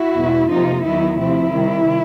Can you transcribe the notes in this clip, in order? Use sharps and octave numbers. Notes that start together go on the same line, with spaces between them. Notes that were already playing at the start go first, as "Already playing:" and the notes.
Already playing: E4 F#4
E2 B2 G#3
F2 C3 F3 A#3 D#4 F4
D#2 D#3 F#3 B3 D#4 E4
C3 F3 A3 C4 E4
C3 D#3 G3